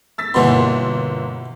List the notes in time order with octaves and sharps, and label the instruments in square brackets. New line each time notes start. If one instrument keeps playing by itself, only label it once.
[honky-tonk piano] E6 A6 B6
[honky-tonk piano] G1 A#3 C6 [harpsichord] B2 E3